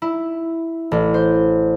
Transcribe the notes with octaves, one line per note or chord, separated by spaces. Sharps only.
E4
A1
C5